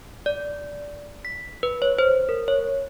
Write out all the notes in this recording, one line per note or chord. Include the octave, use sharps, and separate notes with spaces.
D5
B6
B4
C#5
C5
A#4
C#5